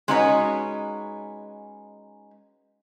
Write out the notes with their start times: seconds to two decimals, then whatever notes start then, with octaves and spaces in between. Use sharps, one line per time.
0.08 G#3 C#4 D#4 F#4 B4 C#5